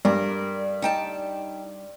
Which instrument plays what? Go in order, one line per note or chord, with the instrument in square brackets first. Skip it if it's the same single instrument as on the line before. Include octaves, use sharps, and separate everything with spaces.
[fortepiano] G2 [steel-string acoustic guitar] A#4 [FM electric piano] D5
[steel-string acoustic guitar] D#4 G5 A5